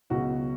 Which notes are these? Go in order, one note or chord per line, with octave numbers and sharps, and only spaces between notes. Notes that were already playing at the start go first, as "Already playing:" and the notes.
C#2 B2 F#3 F#4